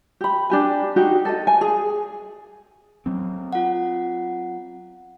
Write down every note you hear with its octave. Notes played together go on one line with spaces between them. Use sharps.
G4 B5
D4 G4 G#5
D#4 F#4 G4
A4 D#5
G#5
G#4
F#3 C4
F4 F#5